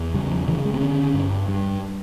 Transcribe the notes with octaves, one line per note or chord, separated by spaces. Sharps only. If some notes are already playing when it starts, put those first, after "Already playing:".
Already playing: E2
C#3 G3
F3
C#3 E3
G#3
C4
D3 C#4
G2
G2